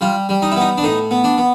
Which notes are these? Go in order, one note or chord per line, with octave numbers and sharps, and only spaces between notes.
G3 F4
G3
D#4
E4
B3 D#4
D4
A2 D#4
B3
D4
B3